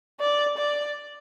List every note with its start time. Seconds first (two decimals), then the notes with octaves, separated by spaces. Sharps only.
0.20 D5
0.58 D5